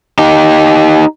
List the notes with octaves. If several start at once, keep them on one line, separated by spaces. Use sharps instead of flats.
D#4 G4